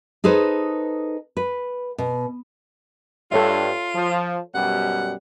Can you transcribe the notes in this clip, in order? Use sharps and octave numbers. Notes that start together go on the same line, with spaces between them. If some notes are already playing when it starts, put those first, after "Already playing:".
D#4 G#4 A4 B4 C5
B4
B2
G2 F4 A4 C#5 E5
F3
F#2 B2 G3 F#5